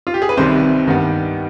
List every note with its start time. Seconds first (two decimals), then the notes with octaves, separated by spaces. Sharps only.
0.07 F4
0.14 G4
0.22 G#4
0.29 B4
0.37 C2 C3 D#3 G3 C5
0.86 G2 D#3 G3 B3